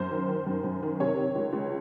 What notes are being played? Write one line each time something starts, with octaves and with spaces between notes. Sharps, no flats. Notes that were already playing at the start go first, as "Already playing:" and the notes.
Already playing: F#2 C5
D#3
D#3
F#2
F#2
D#3
C3 C#5
D#3
C#2
C#2